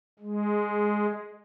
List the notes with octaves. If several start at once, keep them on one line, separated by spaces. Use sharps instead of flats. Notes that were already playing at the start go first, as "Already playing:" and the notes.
G#3